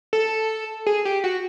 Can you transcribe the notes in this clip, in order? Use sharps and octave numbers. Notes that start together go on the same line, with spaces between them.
A4
G#4
G4
F#4